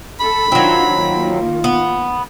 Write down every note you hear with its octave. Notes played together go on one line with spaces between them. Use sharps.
A4 B5
D#3 F#3 C4 D4 F4
D#3 A#3 F4
B3